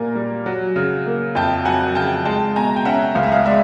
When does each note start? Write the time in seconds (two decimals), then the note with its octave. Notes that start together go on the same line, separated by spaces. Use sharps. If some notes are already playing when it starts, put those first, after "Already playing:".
Already playing: A#2 G3 A#3 G#5 A#5
0.15 G3
0.46 F#3
0.76 C#3
1.06 A#3
1.35 F2 G5 A5
1.65 F#3 F#5 G#5
1.95 C#3 G5 A5
2.25 G#3 G5 A5
2.56 B2 G#5 A#5
2.76 G5
2.85 C#4 E5 F#5
3.15 C#2 F5
3.23 E5
3.31 D#5 F5
3.46 G#3 D5 E5